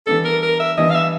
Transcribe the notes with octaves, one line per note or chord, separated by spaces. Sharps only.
E3 G3 B3 D4 A4
A#4
A#4
E5
E3 G3 B3 D4 D#5
F5
E5